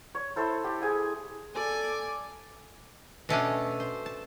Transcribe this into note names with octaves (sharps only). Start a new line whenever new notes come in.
C#5
E4 A4 C5
G4
G#4 G#5
A4 D5 G#5 D6
B2 A3 C#4 D4
C5
A5